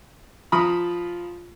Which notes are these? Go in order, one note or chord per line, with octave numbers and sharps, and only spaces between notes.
F3 F4 A#5 B5 D#6